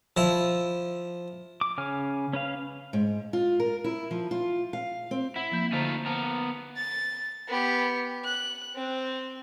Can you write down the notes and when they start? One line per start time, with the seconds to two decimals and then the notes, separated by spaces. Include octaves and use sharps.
0.17 F3 E4
1.61 D6
1.78 C#3 C#5 G#5 F6
2.33 C#4 B4 F5
2.93 G#2
3.33 F4
3.60 A#4
3.84 E4
4.11 F3
4.31 F4
4.73 F5
5.11 C4
5.36 E4 F#5
5.51 F3 A#3 G6
5.72 D3 A3 D#4 F4 C5 A#5
6.06 B3 A#4 C5 A5
6.76 A6
7.48 B3 G4
8.24 F#6
8.76 C4